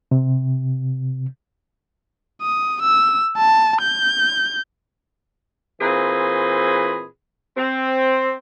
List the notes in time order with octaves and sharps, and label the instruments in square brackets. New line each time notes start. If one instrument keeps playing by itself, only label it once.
[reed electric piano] C3
[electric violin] D#6
E6
A5
G6
[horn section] A#2 E3 C4 G#4 B5
C4